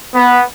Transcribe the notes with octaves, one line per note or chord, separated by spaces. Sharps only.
B3